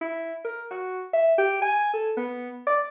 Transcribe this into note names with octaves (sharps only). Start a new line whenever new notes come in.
E4
A#4
F#4
E5
G4
G#5
A4
B3
D5